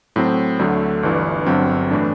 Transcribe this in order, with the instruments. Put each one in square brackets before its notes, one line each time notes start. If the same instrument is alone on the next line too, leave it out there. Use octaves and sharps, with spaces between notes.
[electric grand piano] A2 F#3 C4
D2 D3 F#3 A3
G1 G2 E3
G1 G2 F#3 C4
A2 E3 A3 D4